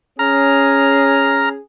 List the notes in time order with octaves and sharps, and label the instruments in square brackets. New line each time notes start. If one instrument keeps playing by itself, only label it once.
[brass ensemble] C#4 G#4 [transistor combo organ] A#5 F6